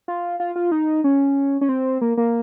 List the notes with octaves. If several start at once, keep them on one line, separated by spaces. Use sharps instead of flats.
F4
F4
F4
D#4
C#4
C#4
C4
A#3
A#3